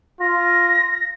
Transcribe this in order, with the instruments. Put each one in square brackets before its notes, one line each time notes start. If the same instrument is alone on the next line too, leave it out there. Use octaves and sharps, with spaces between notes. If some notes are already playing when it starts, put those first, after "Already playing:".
[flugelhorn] F4 [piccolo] A#6